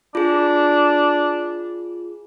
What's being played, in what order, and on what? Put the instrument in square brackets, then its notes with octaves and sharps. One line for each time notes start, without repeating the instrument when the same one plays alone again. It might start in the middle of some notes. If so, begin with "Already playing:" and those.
[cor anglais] D4 [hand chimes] F4 G#4